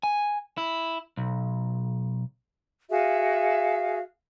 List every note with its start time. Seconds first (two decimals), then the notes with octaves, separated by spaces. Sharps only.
0.03 G#5
0.58 E4
1.17 B1
2.90 F#4 G#4 E5 F5